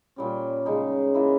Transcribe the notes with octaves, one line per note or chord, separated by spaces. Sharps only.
A#2 G3 C#4
C#3 G#3 D#4 G#4
E3 A#3 E4